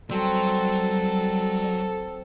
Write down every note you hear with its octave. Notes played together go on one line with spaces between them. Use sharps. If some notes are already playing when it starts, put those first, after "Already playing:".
F#3 G3 C4 A4